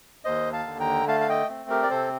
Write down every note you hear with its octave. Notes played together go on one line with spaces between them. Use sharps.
D#2 C5 D#5
F5 A5
D3
G5 A#5
A3 F5 A5
F5
D#5 G5
C4
G4 A#4
D5
C3 A4 C5